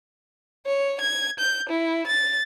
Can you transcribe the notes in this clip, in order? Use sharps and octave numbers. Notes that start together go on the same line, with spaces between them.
C#5
G#6
G6
E4
A6